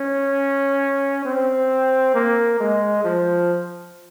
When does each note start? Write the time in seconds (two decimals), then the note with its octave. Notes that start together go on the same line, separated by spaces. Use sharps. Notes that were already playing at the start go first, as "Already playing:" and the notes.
Already playing: C#4
1.25 C4
2.14 A#3
2.60 G#3
3.04 F3